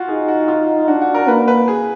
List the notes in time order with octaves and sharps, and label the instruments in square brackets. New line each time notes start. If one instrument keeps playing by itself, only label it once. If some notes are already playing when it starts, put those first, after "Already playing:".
Already playing: [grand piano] F4 F#4
[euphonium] D#4 [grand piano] G#4
[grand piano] F#4
F4
[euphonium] D4 [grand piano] F#4
[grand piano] F#4
A#4
[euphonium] A#3 [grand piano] B4
[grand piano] B4
G#4